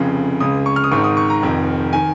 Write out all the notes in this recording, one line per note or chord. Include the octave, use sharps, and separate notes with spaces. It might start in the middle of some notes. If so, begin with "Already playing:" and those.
Already playing: F1 F2 C#3
C#2 C#3 D#6
C#6
F6
D#6
G#1 G#2 D#3 C#6
D#6
C#6
A#5
F1 F2 D#3
D#3 G#5